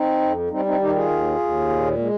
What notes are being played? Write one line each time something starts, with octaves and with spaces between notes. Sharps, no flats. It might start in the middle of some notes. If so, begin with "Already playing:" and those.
Already playing: C4 D#4
F2
G3 C4 D#4
C4 D#4
D#3 D#4 G4
F4 G#4
D#2
D#2
A#2
G#3